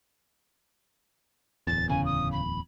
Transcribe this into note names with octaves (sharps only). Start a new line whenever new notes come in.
D1 E2 A6
C#3 G#5
D#6
B5